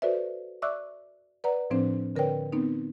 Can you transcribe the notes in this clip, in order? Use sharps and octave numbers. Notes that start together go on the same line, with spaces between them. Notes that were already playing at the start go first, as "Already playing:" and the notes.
F#4 A4 B4 C5 D5 E5
D5 E5 C#6 D6 E6 F#6
B4 D5 F#5 A#5
A2 F3 C4 D4 C5
D3 A#4 B4 C#5 G5
B3 C4 D#4